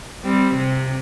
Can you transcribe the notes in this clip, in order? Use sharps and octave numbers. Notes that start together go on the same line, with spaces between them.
G3 C4
C3